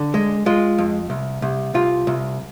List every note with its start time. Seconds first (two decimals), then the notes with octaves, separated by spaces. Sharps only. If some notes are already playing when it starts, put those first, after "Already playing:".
Already playing: D3
0.14 G#3
0.46 G#3 F4
0.78 F2
1.10 C2
1.42 C2
1.74 C2 F4
2.07 C2